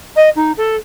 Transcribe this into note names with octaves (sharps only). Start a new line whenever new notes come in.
D#5
D#4
A4